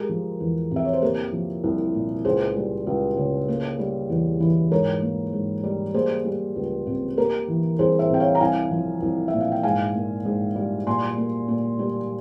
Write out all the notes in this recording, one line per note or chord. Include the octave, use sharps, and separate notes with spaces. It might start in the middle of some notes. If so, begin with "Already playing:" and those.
Already playing: G#3 G4 A#4
F3
E2
C3 E5
C#5
C5
A#3 G4 A#4
F3
C2
A#2
C#2 G#4 C5
G3
C#2
C#3
A#3
G3
E2
E3
G#2 A#4 C#5
A#3
G#2
G3
A#3 G#4 C5
G3
C#2
C3
A#3 G4 A#4
E3
C2 G#4 C5
C5 E5
C3 G5
C#5 F5
A#5
C2 F5 G#5
F3
C2
E5
A#2
F5
G5
G#2 F5 G#5
A#3
G#2
G3
A#2 G#5 C6
A#3
A#2
G3